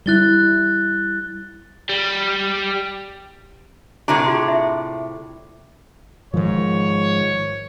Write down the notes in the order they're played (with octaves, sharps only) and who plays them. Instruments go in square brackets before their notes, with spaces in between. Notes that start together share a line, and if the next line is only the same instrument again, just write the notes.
[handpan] G3 E4 [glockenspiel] F#6 A6 G7
[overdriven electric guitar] G3
[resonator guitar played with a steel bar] A2 C3 D4 [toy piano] F#4 A5 A#5
[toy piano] F4 G#4 C6
E5
[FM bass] G#2 [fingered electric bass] D#3 F3 [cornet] C#5